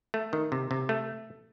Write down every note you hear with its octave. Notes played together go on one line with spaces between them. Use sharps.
A3
D#3
C3
C3
A3